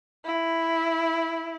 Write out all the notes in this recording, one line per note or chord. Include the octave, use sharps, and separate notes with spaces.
E4